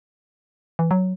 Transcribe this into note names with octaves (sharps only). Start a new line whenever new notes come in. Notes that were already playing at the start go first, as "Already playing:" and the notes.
E3
F#3